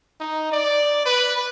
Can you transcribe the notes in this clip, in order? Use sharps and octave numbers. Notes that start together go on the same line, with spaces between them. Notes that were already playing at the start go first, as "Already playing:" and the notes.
D#4
D5
B4